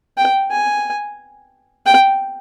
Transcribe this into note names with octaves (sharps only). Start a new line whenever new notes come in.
G5
G#5
G5